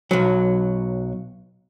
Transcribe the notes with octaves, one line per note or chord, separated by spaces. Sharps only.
B1 F#3